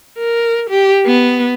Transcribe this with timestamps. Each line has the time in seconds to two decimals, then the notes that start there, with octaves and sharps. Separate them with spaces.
0.18 A#4
0.70 G4
1.06 B3